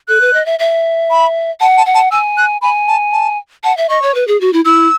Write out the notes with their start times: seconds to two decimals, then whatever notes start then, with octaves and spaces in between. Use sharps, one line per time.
0.08 A4 F#6
0.21 B4
0.34 D#5
0.46 E5
0.59 E5
1.10 B5
1.61 F#5 A5
1.77 A5
1.86 F#5
1.95 A5
2.11 G#5 E6
2.37 F#6
2.62 G#5 B5
2.88 A5
3.13 A5
3.64 F#5 A5
3.77 E5
3.89 D#5 C#6
4.02 C#5
4.15 B4
4.28 G#4
4.41 F#4
4.53 E4
4.65 E4 E6